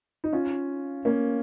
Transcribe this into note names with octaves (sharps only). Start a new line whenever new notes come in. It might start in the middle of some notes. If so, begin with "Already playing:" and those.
D#4
C#4 F4
A#3 C#4